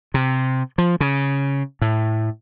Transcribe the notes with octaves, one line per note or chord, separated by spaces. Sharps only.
C3
F3
C#3
A2